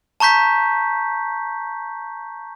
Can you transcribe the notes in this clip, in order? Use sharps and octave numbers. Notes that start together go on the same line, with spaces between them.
A5 A#5 C#6 G6 B6